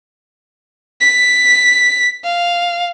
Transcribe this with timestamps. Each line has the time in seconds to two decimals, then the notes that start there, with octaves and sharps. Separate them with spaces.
1.01 B6
2.24 F5